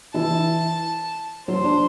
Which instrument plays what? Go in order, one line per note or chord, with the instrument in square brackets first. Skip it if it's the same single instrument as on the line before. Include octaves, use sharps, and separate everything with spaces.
[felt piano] E3 E4 [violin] A5
[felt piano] F#3 F#4 [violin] C5
[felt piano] D4